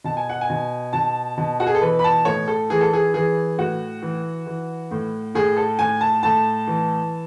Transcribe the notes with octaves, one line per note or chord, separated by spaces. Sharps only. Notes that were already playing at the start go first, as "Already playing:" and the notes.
B2 A5
G#5
F#5
G#5
B2
B2 A5
B2
F#4
G#4
A4
E3 B4
B5
A5
A2 C#5
A4
E3 G#4
A4
G#4
E3 G#4
A2 F#4
E3
E3
A2
A2 G#4
A4
A2 G#5
A5
A2 A5
E3